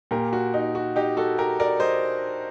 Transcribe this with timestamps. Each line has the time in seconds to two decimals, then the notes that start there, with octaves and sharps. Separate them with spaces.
0.11 A#2 G4 A#4
0.33 F#4
0.54 D#4
0.75 F#4
0.96 D#4 G4
1.17 F#4 A4
1.38 G4 A#4
1.60 A#4 D5
1.80 C5 D#5